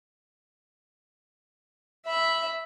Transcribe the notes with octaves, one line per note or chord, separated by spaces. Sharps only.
E5 B5